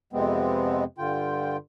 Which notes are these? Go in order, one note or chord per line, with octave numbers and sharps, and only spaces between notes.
F2 C3 G#3 B3 C4
G2 D3 F4 G5